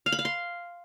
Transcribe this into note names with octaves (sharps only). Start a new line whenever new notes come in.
F5
B5
F5
C6